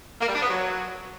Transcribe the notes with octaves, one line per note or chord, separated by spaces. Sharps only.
A#3
G3
D4
B3
F#3